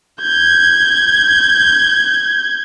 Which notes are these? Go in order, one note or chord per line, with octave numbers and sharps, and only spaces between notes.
G6 G#6